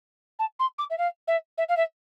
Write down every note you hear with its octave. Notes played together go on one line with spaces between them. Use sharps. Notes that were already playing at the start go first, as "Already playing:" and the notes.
A5
C6
D6
E5
F5
E5
E5
F5
E5